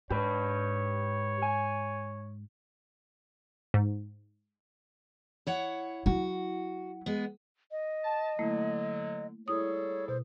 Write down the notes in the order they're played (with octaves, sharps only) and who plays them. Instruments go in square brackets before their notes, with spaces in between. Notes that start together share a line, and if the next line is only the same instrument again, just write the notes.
[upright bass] G#2 [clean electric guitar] G4 B4 [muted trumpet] C#5
[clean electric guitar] G#5
[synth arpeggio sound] G#2
[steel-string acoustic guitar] E4 C#5 F#5
[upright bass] F#3 E4 [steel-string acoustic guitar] F#4
[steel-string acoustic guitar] G#3 B3
[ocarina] D#5
[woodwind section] A5
[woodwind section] D3 F#3 [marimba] A3 A#3 E4
[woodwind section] G3 G#4 A4 [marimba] E4 D#6 [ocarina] C#5
[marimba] B2 [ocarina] C5